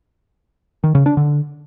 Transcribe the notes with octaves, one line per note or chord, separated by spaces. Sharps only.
D#3
C#3
D4
D3